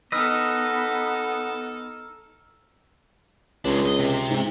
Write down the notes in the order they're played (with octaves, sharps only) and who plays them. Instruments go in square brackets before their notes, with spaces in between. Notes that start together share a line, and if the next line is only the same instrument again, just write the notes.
[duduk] B3 [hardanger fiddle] D#4 A4 [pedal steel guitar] B4 D#5 [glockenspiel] E6 F6
[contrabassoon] C#2 [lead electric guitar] G#3 D4
[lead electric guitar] D#5
C3
[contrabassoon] G#2